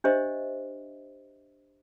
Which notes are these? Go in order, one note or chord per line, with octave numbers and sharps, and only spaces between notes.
D4 G4 C5 D#5 E5